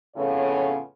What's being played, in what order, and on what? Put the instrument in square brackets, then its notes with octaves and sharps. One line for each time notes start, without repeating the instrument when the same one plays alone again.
[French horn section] F2 A2 C#3 B3 F4 C#5